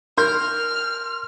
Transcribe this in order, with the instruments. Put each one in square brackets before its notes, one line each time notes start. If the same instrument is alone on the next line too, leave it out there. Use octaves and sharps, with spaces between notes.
[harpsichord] A#4 [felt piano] C6 G6 [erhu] F6